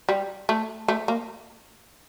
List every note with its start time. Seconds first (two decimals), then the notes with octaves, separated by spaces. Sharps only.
0.09 G3
0.49 A3
0.88 A3
1.08 A#3